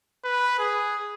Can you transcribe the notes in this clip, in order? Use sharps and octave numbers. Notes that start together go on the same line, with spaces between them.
B4
G#4